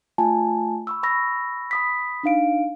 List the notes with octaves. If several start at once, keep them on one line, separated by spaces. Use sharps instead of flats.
A3 F4 G#5 A5
B5 C#6 E6
B5 C#6 E6 A#6
B5 D#6 B6
D4 D#4 F5 D7